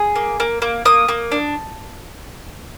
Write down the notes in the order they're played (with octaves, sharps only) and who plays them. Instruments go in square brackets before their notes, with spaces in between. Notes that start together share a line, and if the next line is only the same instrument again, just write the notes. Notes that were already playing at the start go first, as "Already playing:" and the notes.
Already playing: [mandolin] G#4
A#3
A#3
A#3
A#3 D#6
A#3
D4